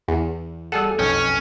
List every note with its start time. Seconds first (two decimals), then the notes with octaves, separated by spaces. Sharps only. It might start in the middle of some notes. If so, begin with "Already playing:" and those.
0.08 E2
0.72 G3 G#4 A4 F#5
0.99 B1 F2 C#4 G5